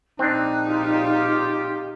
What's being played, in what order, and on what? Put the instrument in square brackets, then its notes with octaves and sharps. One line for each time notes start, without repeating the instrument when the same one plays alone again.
[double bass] A#1 D#4 [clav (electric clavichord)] C4 D4 [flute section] F#6
[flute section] F4 [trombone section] G4